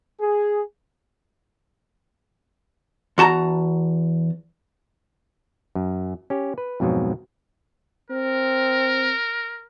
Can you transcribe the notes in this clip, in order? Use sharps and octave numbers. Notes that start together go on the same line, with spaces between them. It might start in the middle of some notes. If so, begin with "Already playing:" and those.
G#4
E2 F#4 A5 A#5
F#2
C#4 G4
B4
F2 G#2 B2 F3 F#3
C4 A#4